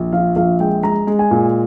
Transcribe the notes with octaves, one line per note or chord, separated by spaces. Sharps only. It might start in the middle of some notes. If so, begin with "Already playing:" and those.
Already playing: A#1
F3 F5
A#1 F5
G#3 G5
G#3 A#5
G#3
G#5
A#2